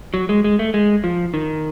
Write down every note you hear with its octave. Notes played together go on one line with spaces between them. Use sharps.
F#3
G#3
G#3
A3
G#3
F3
D#3